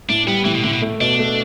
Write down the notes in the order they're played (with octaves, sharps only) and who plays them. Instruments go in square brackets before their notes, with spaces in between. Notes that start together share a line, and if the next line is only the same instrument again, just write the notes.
[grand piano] A2 [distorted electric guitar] D4
[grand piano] G3 [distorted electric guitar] B3
[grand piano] A2 [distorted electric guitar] E3
[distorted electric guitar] B2
[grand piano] A2 [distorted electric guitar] D3
[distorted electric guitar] B2
[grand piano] A3
[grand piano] B2 [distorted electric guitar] D4
[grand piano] A3